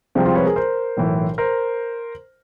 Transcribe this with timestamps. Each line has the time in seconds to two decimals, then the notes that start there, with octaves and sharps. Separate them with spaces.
0.15 C2 C3 F3 G#3 C4 D4
0.25 F4 G4
0.35 B4 C#5
0.46 G#4 A#4
0.56 A#4 C5
0.97 B1 A2 E3
1.38 A#4 C5